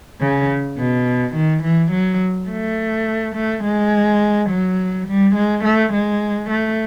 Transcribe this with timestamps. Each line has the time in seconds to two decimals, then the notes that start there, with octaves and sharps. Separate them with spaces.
0.21 C#3
0.78 B2
1.35 D#3
1.63 E3
1.92 F#3
2.49 A3
3.35 A3
3.64 G#3
4.50 F#3
5.08 G3
5.35 G#3
5.64 A3
5.93 G#3
6.50 A3